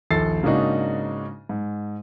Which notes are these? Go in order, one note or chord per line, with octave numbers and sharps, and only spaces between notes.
A#1 D#2 A4 A6 C7
G#2 C#3 A#3 D4 D#4 F#4
G#2